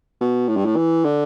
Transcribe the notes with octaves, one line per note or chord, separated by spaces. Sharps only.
B2
A2
G2
A2
E3
D3